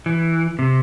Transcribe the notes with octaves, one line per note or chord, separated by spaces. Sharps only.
E3
C3